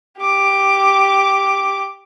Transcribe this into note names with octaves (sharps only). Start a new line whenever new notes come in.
G4 D6